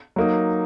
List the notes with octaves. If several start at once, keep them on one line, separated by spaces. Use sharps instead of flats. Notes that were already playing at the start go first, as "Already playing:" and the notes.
F#3 A#3 D#4